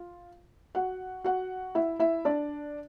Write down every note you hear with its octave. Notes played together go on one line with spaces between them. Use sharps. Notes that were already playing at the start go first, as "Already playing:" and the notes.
Already playing: F4
F#4 F#5
F#4 F#5
E4 E5
E4 E5
D4 D5